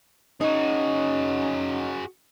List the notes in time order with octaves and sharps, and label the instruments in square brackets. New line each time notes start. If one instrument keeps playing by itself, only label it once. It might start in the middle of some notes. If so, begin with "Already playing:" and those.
[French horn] C#4 [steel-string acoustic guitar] D#4 [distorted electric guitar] F#4 G#4